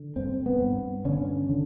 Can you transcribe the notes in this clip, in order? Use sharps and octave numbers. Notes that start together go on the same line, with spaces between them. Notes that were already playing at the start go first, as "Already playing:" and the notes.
Already playing: D3
G2 C4
B3
G2
D3 C#4
D3